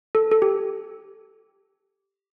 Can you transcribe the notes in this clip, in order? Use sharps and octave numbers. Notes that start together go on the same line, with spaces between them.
A4
A4
G4